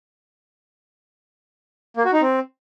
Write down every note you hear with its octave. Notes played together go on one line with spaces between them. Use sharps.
A#3
F#4
D#4
C4